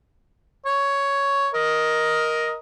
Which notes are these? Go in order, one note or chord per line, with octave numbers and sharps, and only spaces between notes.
C#5
A#4 D#5